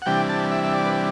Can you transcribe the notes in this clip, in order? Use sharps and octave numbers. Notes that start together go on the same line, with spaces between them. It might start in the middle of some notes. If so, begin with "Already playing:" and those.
F#5
C3 E3 G3 D4 G5
A5
E5
E5
D5
B4